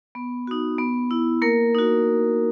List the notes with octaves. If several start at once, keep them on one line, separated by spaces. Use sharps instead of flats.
B3
D#4 F#4
B3
E4
A#3 A#4
D#4 F#4